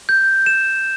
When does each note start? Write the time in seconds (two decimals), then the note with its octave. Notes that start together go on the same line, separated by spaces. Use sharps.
0.09 G6
0.46 E7